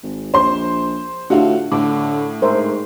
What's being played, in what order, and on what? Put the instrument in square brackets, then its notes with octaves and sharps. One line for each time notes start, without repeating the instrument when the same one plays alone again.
[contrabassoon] G#1
[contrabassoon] A#1 [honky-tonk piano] C5 C6
[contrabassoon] A2 [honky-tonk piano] D3 F4 F#4 [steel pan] D4
[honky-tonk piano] A2 [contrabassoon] D3 [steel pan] D6
[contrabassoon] G#2 [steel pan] A#4 C5 E5